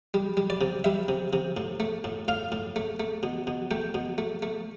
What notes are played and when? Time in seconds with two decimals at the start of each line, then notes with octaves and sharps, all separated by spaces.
0.14 G3
0.37 G3
0.50 D5
0.61 C3
0.84 G3 E5
1.08 C3
1.33 C3
1.57 A2
1.80 A3
2.04 A2
2.28 A2 F5
2.52 A2
2.76 A3
3.00 A3
3.23 B2
3.47 B2
3.71 A3 G5
3.94 B2
4.18 A3
4.43 A3